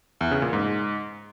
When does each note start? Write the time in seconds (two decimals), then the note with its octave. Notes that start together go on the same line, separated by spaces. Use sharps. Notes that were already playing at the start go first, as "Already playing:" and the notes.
0.21 E2
0.31 C#3
0.42 A#2
0.53 G#2